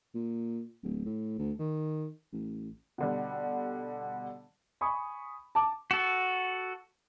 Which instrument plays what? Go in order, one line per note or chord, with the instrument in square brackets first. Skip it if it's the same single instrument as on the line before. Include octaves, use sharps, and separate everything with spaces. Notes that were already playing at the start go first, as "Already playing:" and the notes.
[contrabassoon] A#2
D1
A2
D2
D#3
A1
[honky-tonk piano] B2 D3 G3
[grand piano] G#5 B5 C#6 D#6
A5 D6
[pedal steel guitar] F#4 A4